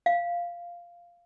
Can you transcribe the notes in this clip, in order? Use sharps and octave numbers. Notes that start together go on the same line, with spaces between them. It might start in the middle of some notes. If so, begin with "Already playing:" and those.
F5